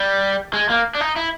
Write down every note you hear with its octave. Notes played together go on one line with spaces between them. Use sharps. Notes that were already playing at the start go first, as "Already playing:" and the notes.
Already playing: G3
G#3
A#3
D4
D#4
E4